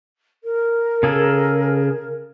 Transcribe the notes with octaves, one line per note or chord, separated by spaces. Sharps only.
A#4
C#3 G#4 A4